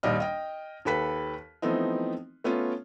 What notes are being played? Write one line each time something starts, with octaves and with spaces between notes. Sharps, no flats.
A#1 D#2 G3 D4 D#5 F6
D#5 G5
D#2 G4 A4 B4 B6
E3 F3 A3 B3 C4 D#4
A3 B3 C#4 F4